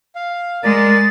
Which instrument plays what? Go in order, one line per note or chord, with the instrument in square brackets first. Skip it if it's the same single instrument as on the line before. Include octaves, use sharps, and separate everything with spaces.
[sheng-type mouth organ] F5
[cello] G#3 [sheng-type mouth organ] A#4 D5 [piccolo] A6